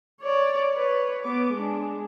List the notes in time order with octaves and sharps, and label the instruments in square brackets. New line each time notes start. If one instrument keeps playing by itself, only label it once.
[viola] C#5 D5
B4 C#5
B3 D6
G#3 D4